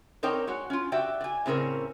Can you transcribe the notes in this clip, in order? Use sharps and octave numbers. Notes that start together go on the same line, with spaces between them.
C4 D#4 A#4 C#5 D5 G5
G#3 F#4 C#5
C#4 F4
F#4 G4 D5 E5 G5
D5 G#5
A2 C#3 C4 C#4 A#4 D5